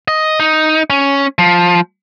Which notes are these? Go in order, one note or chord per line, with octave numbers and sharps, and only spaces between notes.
D#5
D#4
C#4
F3